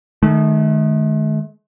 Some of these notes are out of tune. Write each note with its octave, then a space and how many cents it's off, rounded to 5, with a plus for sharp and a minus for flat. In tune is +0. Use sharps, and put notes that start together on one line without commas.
D#3 -20 A3 -40